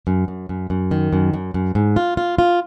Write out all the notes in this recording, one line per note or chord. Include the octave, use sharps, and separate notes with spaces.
F#2
F#2
F#2
F#2
D#3
F#2
F#2
F#2
G#2
F4
F4
F4